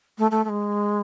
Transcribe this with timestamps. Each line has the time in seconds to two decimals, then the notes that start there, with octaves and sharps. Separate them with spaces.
0.18 A3
0.31 A3
0.44 A3
0.49 G#3